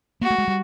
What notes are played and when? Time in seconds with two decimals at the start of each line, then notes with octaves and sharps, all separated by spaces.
0.21 A#3 F#4
0.30 A3
0.38 G#3
0.48 G3